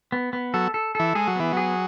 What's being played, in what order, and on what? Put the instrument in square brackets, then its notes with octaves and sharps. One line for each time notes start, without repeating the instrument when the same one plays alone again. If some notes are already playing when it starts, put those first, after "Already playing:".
[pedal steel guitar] B3
B3
[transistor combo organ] F#3 [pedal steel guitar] A4
[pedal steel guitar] A4
[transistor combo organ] E3 [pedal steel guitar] A4
[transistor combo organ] G#3 [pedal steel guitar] G#4
[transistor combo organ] F#3
[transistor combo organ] E3 [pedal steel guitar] B3
[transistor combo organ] F#3 [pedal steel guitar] G#4